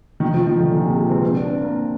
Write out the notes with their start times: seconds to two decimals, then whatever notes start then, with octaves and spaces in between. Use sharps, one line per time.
0.20 D#3
0.34 F3
0.47 D#3
0.58 D3
0.71 A#2
0.84 C3
0.96 G#3
1.10 C4
1.22 C4
1.35 D4
1.47 C4
1.61 A#3